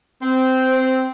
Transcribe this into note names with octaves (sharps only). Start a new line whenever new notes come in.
C4